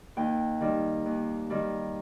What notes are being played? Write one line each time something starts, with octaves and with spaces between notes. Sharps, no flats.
D#2 G5
D#3 G3
D#2
D#3 G3